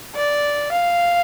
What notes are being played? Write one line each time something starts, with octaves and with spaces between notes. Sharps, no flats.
D5
F5